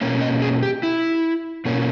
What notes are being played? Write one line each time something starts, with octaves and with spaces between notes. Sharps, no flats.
B2 A#3 C#4
D#5
G#4
G4
E4
B2 A#3 C#4